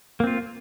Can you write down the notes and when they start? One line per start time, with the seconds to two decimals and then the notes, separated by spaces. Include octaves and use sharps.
0.20 A#3
0.24 C4
0.27 F4